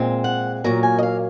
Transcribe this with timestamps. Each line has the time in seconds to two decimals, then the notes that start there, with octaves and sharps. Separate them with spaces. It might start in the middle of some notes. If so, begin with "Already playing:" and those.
Already playing: A#2 G#3 C4
0.24 F#5
0.64 A#2 F#3 A#3 A#5
0.83 G#5
0.99 D#5
1.03 F5